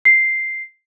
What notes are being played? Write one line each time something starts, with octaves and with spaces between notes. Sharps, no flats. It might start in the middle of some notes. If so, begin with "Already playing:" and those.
C7